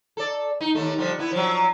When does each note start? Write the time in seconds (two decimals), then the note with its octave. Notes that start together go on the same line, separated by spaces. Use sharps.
0.17 A4 D5
0.61 D#4
0.75 D#2 A3
0.98 D3 F3 G3
1.19 B3 E4
1.32 F3 F#3